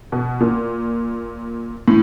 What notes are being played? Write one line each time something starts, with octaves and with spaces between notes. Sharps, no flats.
B2
A#2
A2